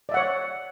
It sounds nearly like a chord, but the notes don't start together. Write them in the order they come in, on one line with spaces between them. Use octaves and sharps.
D5 E5 F#5 C#5